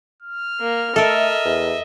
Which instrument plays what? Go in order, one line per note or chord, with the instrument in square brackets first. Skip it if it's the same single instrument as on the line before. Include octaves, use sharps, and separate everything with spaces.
[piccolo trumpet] F6
[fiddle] A#3
[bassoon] A3 [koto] A4 A#4 [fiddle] D#5 E5
[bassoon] E2